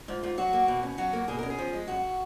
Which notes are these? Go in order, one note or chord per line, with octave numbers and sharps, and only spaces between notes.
G#2 F4
G#2 F4
F#3 F#4
A#3
B2
C#4
F#3 F#4
A#3
B2 G#4
C#4 A#4
G#4
F3
G#3
F#2 F#4